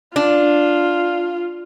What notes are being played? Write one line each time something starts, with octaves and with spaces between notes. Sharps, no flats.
D4 F4